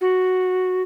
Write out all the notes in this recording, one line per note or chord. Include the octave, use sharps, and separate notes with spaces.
F#4